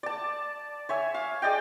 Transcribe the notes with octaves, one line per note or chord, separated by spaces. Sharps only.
D5 A5
C#5 E5 G#5
F5
G#4 D5 D#5 G5